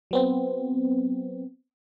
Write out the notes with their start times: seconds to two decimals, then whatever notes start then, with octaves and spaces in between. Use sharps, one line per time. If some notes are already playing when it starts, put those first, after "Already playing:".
0.11 F#3 B3 C4